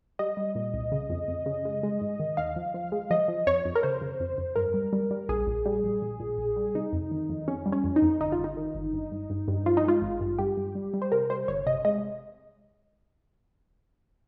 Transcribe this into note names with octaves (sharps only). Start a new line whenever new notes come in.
G3 D#5
G3
A#2
C2
C#3
F2
F2
C#3
G#3
G#3
G#2
D#3
D#2 F5
F3
F3
G#3
F3 D#5
F3
F2 C#5
F2
A#4
C#3 C5
C#3
F2
F2
G2 A#4
G3
G3
G3
A#1 G#4
A#1
G3
A#1
A#1
A#2
A#1
G3
C3 D#4
F2
D#3
F2
F2 C#4
G3
C#4
F2
D#4
F2
G1 D#4
F4
G1
D#4
D#3
G1
G2
G2
G2
G2
F3 F4
D#4
G#3 F4
G#1
G2
G2 G4
G2
G3
G3
C5
C3 A#4
G3 C5
G1 C#5
C3 D#5
G#3 D#5